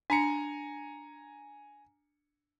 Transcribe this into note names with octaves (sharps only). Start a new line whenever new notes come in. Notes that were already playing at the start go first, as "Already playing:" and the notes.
D4 G#5 A#5 C#7